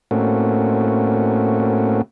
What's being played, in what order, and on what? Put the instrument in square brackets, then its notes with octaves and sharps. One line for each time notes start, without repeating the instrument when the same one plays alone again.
[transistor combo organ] A2 A3 A#3 C4 C#4 F#4